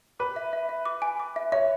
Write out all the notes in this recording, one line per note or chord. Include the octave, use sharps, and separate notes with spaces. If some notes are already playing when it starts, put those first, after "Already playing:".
B4 D6
E5
E5
E5
D6
G#5
D6
E5
C#5 E5